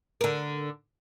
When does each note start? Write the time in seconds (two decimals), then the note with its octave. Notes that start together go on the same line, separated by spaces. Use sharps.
0.21 D3 A#4